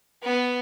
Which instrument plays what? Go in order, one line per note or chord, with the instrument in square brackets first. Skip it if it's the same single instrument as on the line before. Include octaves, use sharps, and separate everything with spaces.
[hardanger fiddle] B3